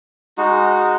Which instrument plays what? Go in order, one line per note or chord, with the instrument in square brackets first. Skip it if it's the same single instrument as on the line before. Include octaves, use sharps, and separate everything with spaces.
[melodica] G#3 D#4 F#4